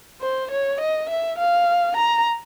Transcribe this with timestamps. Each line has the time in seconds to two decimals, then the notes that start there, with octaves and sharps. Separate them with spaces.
0.22 C5
0.51 C#5
0.80 D#5
1.09 E5
1.38 F5
1.96 A#5